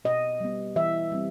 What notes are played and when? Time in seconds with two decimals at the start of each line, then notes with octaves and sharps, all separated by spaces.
0.05 B2 D#5
0.41 G3 B3
0.76 E3 E5
1.12 G3 C4